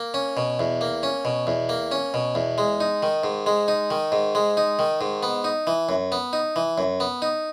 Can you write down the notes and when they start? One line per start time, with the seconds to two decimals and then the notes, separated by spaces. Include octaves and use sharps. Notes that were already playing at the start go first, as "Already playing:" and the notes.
Already playing: A#3
0.14 C#4
0.37 B2
0.59 E2
0.81 A#3
1.03 C#4
1.25 B2
1.47 E2
1.69 A#3
1.92 C#4
2.14 B2
2.35 E2
2.58 G#3
2.80 D#4
3.03 D#3
3.24 G#2
3.47 G#3
3.68 D#4
3.91 D#3
4.12 G#2
4.35 G#3
4.57 D#4
4.79 D#3
5.01 G#2
5.23 B3
5.44 D#4
5.67 E3
5.89 F#2
6.12 B3
6.33 D#4
6.56 E3
6.78 F#2
7.00 B3
7.22 D#4